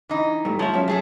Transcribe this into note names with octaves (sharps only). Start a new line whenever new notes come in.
E3 D#4
G2 A3
F3 G#3 C#5 E5
F#3 C#4 E5
A3 G#4 A4